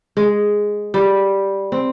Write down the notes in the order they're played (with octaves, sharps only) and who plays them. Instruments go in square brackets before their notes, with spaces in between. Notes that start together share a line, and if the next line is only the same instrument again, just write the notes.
[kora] G#3
G3
C4